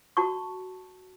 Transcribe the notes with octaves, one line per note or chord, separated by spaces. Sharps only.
F#4 A5 C#6